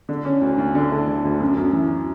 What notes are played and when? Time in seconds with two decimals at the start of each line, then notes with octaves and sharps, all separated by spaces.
0.09 D3
0.25 C#4
0.41 D2
0.58 D2
0.75 D3
0.91 A3
1.07 D3
1.25 D2
1.40 F#2
1.57 F#2
1.73 E3